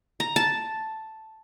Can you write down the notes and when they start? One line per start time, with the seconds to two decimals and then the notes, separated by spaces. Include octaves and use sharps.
0.20 A#5
0.36 A5